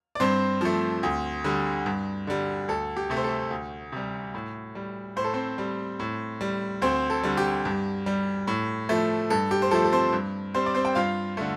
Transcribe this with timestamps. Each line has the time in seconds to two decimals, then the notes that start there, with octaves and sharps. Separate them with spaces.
0.15 D5
0.20 G2 C4 C5
0.61 F3 A3
1.03 D2
1.44 D3 G3
1.86 G2
2.27 D3 G3
2.68 D2 A4
2.97 G4
3.10 C3 A3
3.17 C5
3.24 A4
3.51 D2
3.92 C3 G3
4.34 A2
4.75 G3
5.16 A2 C5
5.24 A4
5.34 C4 C5
5.58 G3
6.00 A2
6.41 G3
6.82 D2 C4 C5
7.10 A4
7.23 D3 G3
7.37 G4
7.65 G2
8.06 G3
8.47 A2
8.89 F3 A3
9.30 G2 A4
9.51 G4
9.62 C5
9.71 F3 A3 A4
9.84 A4
9.92 C4 C5
10.13 G2
10.54 G3 C4 C5
10.66 D5
10.75 C4 C5
10.85 G5
10.95 G2 F4 F5
11.37 D3 A3